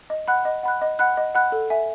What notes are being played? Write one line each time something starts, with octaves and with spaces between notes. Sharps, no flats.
D#5
F#5 B5 F#6
D#5
F#5 B5 F#6
D#5
F#5 B5 F#6
D#5
F#5 B5 F#6
A4
E5 G#5